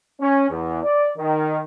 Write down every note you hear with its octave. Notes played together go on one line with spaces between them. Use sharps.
C#4
E2
D5
D#3